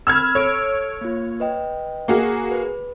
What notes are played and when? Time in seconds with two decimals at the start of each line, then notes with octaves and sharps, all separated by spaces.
0.07 C4 B5 E6 F6 G#6
0.35 A4 C#5 E6 D7
1.01 A#3 F4
1.40 B4 D#5 G5
2.08 A#3 F#4 G#4
2.51 B4